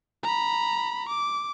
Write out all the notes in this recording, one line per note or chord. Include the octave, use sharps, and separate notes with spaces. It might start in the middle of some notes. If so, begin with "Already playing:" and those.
A#5 B5
D6